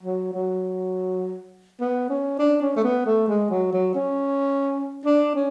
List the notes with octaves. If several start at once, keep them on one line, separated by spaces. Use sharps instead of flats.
F#3
F#3
B3
C#4
D4
C#4
A3
B3
A3
G#3
F#3
F#3
C#4
D4
C#4